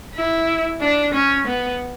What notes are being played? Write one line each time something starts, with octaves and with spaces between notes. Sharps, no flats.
E4
D4
C#4
B3